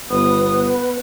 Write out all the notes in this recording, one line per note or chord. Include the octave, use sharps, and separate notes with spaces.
G1 B3 B4 F#5 D#6